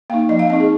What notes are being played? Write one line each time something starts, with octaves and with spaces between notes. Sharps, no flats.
A#3 D#4 F5
F3 D#5
F5
C4 D#4 D#5
G#4